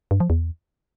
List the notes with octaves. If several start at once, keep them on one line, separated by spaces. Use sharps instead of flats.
G2
F3
E2